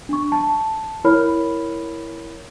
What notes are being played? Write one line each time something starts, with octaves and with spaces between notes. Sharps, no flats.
D4 C#6
A5
E4 A#4 C#5 B5 F6